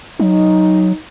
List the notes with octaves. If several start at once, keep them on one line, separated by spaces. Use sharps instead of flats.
F#3 D#4